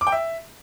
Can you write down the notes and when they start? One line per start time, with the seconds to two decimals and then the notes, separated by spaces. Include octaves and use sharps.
0.01 D6
0.07 G5
0.12 E5